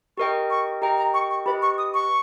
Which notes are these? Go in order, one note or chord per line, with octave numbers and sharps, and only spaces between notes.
G4 A#4 D#5 G5 C#6
C#6
G4 A#4 D#5 G5 A#5
A#5
C#6
C#6
G4 B4 D#5 B5
C#6
D#6
C#6